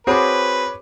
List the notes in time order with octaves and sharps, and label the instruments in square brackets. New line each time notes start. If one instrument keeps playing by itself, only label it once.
[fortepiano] C4 F#4 G#4 [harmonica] B4 [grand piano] C#5 B5 D6